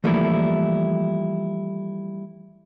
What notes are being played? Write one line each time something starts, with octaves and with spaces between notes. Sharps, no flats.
E3 F3 G3 A3 A#3 E4